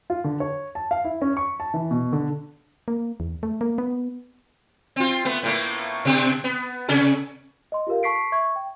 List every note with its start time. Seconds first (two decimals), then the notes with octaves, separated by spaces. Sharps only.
0.10 F4
0.24 D3
0.40 C#5
0.75 A5
0.91 F5
1.04 E4
1.22 C#4
1.37 C#6
1.60 A5
1.74 E3
1.91 B2
2.13 D3
2.88 A#3
3.20 E2
3.43 A3
3.61 A#3
3.78 B3
4.96 C4 F4
5.25 A3 B3
5.43 A2 A3 A#3
6.05 B2 D3 C4
6.44 B3
6.89 C3 C#4 A4
7.72 D#5 C6
7.87 F4 G4 A4 A#4 F5
8.03 A5 C#6 B6 C7 D7
8.32 E5 C#6 G#6
8.56 G5